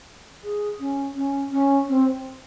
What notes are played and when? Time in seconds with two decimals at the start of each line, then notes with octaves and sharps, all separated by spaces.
0.44 G#4
0.79 C#4
1.15 C#4
1.51 C#4
1.88 C4